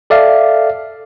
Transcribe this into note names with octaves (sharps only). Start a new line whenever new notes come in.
A4 D5 E5 F5